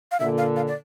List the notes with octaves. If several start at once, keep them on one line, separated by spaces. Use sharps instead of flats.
F5
A#2 D3 E5
F5
F5
D5